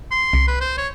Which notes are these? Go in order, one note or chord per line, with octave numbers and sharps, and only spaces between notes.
C6
C2
B4
C5
C#5